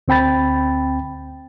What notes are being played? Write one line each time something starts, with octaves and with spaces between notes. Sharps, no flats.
D2 C4 G5 B5 A6